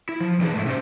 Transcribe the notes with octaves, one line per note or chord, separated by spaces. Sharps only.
E4
F3
E3 D4 D#4 G#4
G#2 A3
C3 C#4 D4 C5